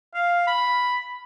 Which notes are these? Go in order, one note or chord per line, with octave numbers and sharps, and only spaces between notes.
F5
B5